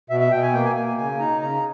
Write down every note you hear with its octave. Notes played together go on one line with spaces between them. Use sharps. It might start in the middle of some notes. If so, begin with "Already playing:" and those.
B2 E5
E5
B2 G5
G#5
A#3 G5
G#5
A#3 G#5
G#5
C#3 G#5
D#4 A#5
C#3 A#5